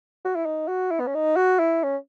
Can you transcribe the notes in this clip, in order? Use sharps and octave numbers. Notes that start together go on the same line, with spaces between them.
F#4
E4
D#4
F#4
E4
B3
C#4
D#4
F#4
E4
C#4